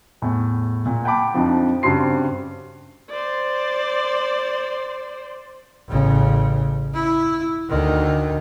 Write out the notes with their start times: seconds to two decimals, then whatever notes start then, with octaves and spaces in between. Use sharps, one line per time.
0.22 E2 A2
0.86 A#2
1.04 F#5 G5 A5 B5 D6
1.34 F2 F3 D4 D#4
1.83 G2 C#3 C4 F#4 C6 C7
3.10 C5 D5
5.88 A1 C#3
6.94 E4
7.69 D2 D#3